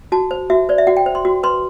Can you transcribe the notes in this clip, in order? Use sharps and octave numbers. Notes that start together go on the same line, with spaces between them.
F#4 A5
C5
F#4 E5
C5 D5
E5
F#4 F#5
G5
C5
C6
F#4
B4 C6